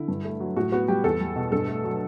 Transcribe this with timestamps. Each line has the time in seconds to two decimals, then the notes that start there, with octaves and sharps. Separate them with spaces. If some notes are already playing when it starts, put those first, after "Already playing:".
Already playing: D3 E4
0.08 G2
0.25 A3
0.40 F#3
0.56 A2 F#4
0.72 B3 F#4
0.88 G3 G4
1.04 E2 A4
1.20 G3
1.36 B2
1.52 G2 A4
1.68 A3
1.84 F#3